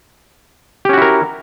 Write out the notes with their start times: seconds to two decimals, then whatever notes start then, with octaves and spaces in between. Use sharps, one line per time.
0.85 G4
0.89 C#4
0.93 F#4
0.98 E4
1.02 A#4